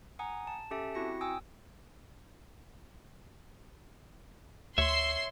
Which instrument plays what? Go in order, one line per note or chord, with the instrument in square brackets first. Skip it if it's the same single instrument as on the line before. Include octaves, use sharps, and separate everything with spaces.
[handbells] F#5 G#5 A#5 D#6
A5
C#4 G4 A4 E5 A5
C4 E4 F#4 A#6 C#7
G5 G#5 D#6 E6
[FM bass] D2 [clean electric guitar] C#5 E5 [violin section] C6 E6 C7